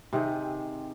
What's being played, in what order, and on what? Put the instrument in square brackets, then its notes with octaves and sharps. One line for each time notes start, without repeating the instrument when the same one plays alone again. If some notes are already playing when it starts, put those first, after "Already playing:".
[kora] C3 D#3 C4 G#4